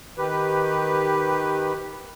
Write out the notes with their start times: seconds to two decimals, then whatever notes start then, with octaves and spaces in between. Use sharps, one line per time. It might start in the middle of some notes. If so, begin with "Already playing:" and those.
0.18 D#3 G4 B4